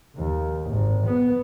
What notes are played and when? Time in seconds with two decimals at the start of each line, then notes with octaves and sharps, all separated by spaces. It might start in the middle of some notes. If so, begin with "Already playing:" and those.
0.17 D#2
0.66 G#1
1.07 B3